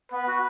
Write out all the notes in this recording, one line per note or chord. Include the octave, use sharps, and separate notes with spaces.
B3 B4
F#4